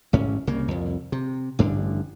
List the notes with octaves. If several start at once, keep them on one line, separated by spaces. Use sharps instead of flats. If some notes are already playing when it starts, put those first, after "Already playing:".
A1 G#2 C#4
C2 C#3 A#3
C2 F2
C3
A1 G2 D3 D4